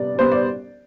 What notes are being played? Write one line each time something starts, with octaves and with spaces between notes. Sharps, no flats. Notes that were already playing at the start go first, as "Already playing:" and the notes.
Already playing: C3 G3 B3 D5
G3 B3 C5
D5